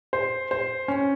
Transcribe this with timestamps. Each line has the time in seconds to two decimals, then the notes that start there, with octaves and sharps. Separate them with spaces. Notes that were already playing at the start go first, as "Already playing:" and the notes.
0.13 C5
0.51 C5
0.88 C#4